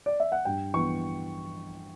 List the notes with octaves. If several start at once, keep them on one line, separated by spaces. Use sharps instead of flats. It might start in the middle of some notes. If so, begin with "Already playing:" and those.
D5
E5
F#5
G2 G5
E3 B3 C#6